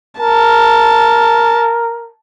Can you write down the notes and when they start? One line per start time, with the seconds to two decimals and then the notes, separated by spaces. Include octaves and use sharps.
0.20 A#4 A5